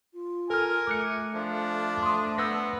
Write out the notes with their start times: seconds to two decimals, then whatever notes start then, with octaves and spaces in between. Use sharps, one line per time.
0.14 F4
0.50 A4 A#4 G#5 F6
0.87 A3 D6 F#6 C#7
1.34 F3 D4
2.03 A3 C6 D#6
2.38 B3 E6 G6 A#6